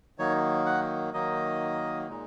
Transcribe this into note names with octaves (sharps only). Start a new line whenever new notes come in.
D#3 F#3 A#3 D#4 C#5
F#5
D#3 F#3 A#3 D#4 D#5
A#2 G#3 D#4